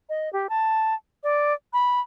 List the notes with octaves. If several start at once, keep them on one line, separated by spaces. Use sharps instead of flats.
D#5
G4
A5
D5
B5